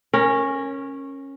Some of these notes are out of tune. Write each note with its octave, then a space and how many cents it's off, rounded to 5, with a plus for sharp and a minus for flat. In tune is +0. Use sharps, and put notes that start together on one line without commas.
C#4 -15 A#4 +0